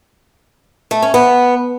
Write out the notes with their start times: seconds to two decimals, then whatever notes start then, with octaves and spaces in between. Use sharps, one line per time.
0.91 A3
1.02 C#4
1.14 B3